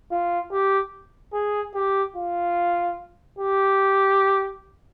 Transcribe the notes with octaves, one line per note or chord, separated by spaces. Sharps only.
F4
G4
G#4
G4
F4
G4